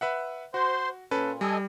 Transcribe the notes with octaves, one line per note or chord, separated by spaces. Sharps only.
B4 E5 F#5
F#4 C5 C6
A#2 C#4 A4 B4
G3 A4 D#5 G#5